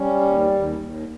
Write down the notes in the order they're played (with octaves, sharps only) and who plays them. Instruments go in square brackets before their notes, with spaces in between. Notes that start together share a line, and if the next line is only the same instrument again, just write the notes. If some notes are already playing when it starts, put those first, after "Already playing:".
Already playing: [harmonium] G3 C#4
D#2
D#2
D#2